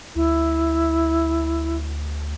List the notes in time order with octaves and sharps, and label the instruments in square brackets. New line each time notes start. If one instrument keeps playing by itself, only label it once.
[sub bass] D2 [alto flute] E4